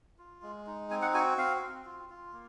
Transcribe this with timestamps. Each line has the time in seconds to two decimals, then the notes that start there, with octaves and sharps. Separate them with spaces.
0.18 F4
0.42 G#3
0.67 D#4
0.90 C4 G#5
1.02 F#5
1.14 F#4 G#5
1.38 C4 F5
1.62 C4
1.85 F4
2.10 F4
2.33 A#3